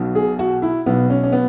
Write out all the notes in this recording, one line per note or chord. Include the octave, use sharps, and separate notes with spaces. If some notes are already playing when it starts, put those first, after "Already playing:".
Already playing: B1 B2
G#4
F#4
E4
B1 B2 B3
C#4
C#4
B3